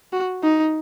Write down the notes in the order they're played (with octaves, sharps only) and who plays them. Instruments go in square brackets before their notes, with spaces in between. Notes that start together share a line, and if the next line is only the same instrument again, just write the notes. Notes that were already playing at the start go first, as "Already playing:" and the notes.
[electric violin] F#4
D#4